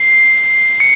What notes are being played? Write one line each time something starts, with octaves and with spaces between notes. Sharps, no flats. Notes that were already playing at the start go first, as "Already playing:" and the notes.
Already playing: C7
C#7